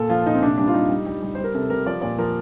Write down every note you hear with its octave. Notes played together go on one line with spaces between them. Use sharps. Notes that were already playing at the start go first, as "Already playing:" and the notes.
Already playing: A#2 A4
F3 F4
A#2 D#4
C4
C3 D4
G3 D4
F4
G3 D#4
G3
G3
G3
G3 C5
A#4
C3 A4
G3 A#4
F3 D5
A#2 D5
F3 A#4